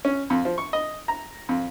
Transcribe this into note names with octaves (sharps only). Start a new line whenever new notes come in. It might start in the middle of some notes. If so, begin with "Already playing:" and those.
C#4
F2
F3
C#6
D#5
A#5
F2